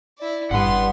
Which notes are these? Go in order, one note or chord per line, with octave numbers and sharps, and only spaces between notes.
E4 D5
G1 G2 F#5 B5 C6